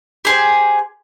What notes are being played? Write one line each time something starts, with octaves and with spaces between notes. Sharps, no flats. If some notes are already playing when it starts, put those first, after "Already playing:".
G4 G#4 C5